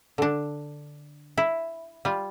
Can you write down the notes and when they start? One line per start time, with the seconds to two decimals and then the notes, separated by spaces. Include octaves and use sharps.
0.18 D3 D4
1.38 E4
2.05 G3 F4